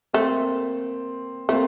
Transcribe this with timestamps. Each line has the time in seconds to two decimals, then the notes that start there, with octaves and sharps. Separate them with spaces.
0.13 A3 A#3 C4
1.49 A3 A#3 C4